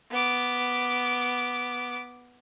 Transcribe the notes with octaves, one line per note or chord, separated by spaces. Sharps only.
B3 D6